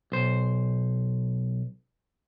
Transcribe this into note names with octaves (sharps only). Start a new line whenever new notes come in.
B1 C5